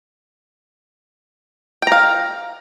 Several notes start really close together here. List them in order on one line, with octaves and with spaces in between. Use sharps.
G5 A#5 F5